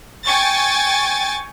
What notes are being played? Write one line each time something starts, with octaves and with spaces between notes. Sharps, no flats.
G5 G#5 C#6 A6